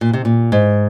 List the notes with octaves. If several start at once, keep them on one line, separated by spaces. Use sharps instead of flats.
A#2
C3
A#2
G#2